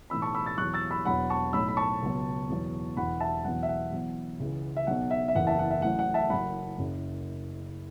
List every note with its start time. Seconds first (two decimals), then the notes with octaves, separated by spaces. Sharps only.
0.10 B1 A2 E3 B5 E6
0.22 A5 C#6
0.35 B5 E6
0.46 E6 A6
0.58 E2 B2 F#3 C#6 F#6
0.74 E6 A6
0.91 B5 E6
1.05 E1 E2 B2 F#3 F#5 B5
1.30 A5 C#6
1.53 B1 A2 F#3 B5 E6
1.68 B5
1.77 A5 C#6
2.02 C#2 B2 F#3
2.49 E2 B2 F#3
2.97 E1 E2 E3 F#5 B5
3.20 E5 A5
3.44 E1 E2 B2 F#3 F#5
3.63 E5
3.68 F#5
3.92 E2 B2 F#3
4.40 C#2 C#3 E3
4.77 E5
4.87 B1 B2 F#3 F#5
5.11 E5
5.28 E5
5.35 F#1 E2 E3 F#5
5.47 E5 A5
5.59 F#5
5.71 E5
5.82 A1 A2 F#3 F#5
5.99 F#5
6.14 E5 A5
6.30 F#1 F#2 F#3 F#5 B5
6.78 F#1 F#2 C#3